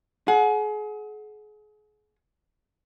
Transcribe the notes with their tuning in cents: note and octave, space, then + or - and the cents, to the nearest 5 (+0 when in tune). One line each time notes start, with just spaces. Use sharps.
G#4 +35 F#5 -10